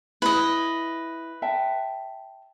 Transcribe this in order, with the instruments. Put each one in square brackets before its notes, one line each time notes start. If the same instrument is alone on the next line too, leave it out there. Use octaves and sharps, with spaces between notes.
[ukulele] E4 [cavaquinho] B4 D#5
[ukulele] E5 G5 A5